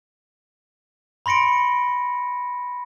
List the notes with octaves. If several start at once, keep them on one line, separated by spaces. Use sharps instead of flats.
B5 C6 A#6 C#7 D7